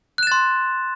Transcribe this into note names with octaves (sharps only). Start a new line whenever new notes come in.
C6 F#6 A6 E7